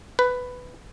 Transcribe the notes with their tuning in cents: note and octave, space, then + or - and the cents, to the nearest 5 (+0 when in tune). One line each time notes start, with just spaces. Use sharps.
B4 +10